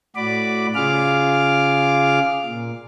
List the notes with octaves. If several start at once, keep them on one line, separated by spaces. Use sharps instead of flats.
A2 F#4 D5 B5 D6
C#3 F4 G#4 F5 D6 F6
A#2